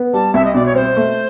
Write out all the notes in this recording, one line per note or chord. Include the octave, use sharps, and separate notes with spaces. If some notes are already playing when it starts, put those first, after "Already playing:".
Already playing: B3
G3 A5
C2 E5
D#5
B2 D5
C#5
C4 C5
A3